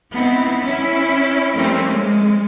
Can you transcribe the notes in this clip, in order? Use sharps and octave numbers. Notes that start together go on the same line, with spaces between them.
B3 C4 D#4 E4
C#4 E4
F3 G3 A3 A#3 C4 C#4
G#3